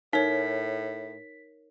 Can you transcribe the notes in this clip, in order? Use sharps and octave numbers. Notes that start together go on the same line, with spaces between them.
A2 D#4 A#4 C#5 B6